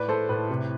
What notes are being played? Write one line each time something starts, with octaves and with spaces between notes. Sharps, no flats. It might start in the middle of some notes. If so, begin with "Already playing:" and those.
Already playing: A2 B4 D5
A3 A4 C5
A2 B4
C3